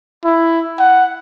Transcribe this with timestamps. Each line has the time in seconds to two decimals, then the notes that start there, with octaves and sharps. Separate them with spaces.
0.25 E4
0.79 F#5